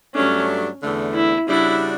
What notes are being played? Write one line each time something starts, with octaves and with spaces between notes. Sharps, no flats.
G2 F#3 A3 C#4 D4
E2 D3 A3
E4
C#3 G3 D4 E4 F#4